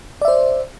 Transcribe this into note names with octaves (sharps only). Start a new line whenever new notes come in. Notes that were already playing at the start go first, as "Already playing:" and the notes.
C5 D5 E5